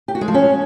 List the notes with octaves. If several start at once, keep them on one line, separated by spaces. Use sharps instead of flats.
G4
F#4
G#3
F3
C#4